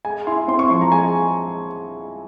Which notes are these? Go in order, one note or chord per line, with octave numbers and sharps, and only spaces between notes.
G#3 G#5
E4 C6
C4 C6
C#6
F3 C6
A#5
G#3 G#5